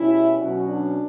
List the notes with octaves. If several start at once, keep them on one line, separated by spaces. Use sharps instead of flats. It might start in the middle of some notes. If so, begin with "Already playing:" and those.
Already playing: B2 G3 C#4 E4
B2 F#3 C#4 F#4
D4